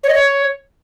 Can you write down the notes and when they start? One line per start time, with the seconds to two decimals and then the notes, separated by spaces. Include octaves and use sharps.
0.04 C#5
0.09 D#5
0.14 C#5